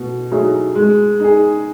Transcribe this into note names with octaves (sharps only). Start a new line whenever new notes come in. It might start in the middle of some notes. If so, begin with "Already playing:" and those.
Already playing: B2 A3
F#3 A3 D#4 G#4
G#3
D#4 G#4